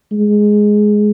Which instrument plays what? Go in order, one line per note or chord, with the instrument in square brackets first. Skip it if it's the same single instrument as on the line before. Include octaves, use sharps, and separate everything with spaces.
[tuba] G#3